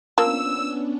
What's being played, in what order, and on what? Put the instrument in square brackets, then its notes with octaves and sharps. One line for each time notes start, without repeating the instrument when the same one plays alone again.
[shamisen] F3 A#3 [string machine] B3 C#4 D4 [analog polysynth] E6